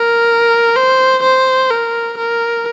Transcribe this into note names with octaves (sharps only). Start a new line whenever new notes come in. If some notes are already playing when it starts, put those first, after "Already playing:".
Already playing: A#4
C5
C5
A#4
A#4